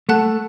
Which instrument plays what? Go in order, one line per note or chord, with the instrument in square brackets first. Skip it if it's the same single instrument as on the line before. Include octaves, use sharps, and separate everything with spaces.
[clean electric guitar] A3 [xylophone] F#5 A5 F#6